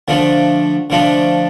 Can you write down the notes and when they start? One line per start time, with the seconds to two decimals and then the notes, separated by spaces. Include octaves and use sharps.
0.08 D3 F3 A3 D4
0.90 D3 F3 A3 D4